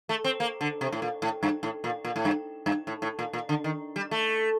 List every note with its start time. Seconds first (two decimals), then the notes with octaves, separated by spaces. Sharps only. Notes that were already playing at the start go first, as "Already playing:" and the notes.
0.09 A3
0.24 C4
0.40 A#3
0.61 D3
0.81 C3
0.92 A2
1.02 A#2
1.22 A2
1.43 G2
1.63 A2
1.84 A#2
2.05 A#2
2.16 A2
2.25 G2
2.66 G2
2.87 A2
3.02 A2
3.19 A#2
3.33 A#2
3.49 D3
3.64 D#3
3.96 G3
4.11 A3